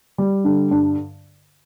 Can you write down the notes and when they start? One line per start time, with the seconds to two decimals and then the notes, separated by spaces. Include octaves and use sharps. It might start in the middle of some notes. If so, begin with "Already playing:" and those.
0.18 G3
0.44 D3
0.71 G2